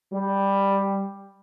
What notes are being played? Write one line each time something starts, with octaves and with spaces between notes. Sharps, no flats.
G3